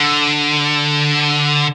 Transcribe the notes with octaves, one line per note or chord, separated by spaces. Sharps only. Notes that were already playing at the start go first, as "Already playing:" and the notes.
Already playing: D3